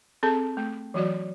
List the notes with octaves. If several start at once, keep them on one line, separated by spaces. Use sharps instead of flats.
C4 G#4 A4 A5
A3
E3 F#3 F#4 D5